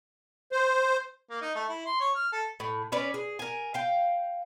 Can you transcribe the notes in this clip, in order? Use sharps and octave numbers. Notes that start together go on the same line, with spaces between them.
C5
A#3
D#4
A3
E4
C6
C#5
F6
A4
A2
C#4 B4 C#5 D5
G#4
A#4 G#5
F5 G5